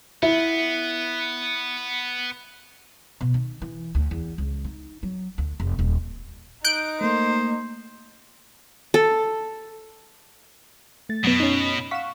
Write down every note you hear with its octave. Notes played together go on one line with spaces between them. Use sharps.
B3 E4
B2
D#3
E3
D2
E2
C#2
D#4
F#3
D2
F1
D#1
D#4 F#6 G6 D7
A3 A#3 C5
A4
A3 A6
F#2 B2 B3
C#4 D#4
F5 F#5 C#6 B6 E7